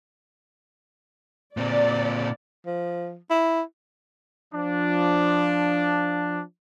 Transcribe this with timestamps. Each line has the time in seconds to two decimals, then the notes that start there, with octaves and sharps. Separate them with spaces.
1.57 A#2 C4 D5
2.66 F3
3.30 E4
4.53 F3 D4